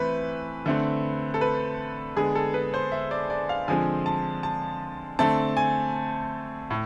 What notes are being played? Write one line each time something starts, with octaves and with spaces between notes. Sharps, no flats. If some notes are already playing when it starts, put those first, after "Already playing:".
Already playing: E3 A3 C4 B4
D3 A3 C4
A4
B4
D3 G#3 B3 G#4
A4
B4
C5
E5
D5
D5
F5
D3 F3 G#3 C4 G#5
A5
A5
D3 A3 C4 A5
G#5
A2